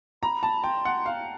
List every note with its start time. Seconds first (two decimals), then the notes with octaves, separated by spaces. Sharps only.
0.23 A#5 B5
0.43 A5
0.64 G5 C6
0.85 F#5
1.06 F5